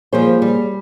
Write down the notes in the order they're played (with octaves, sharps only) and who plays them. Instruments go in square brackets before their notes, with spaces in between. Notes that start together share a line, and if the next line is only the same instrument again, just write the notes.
[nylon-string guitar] F3 G3 C5 [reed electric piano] A#3 G#4 C#5
[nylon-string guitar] G3